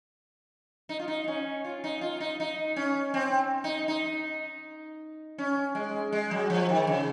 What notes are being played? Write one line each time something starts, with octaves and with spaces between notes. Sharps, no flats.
D#4
F4
D#4
C#4
F4
D#4
F4
D#4
D#4
C#4
C4
D#4
D#4
C#4
G#3
G#3
F#3
F3
D#3
C#3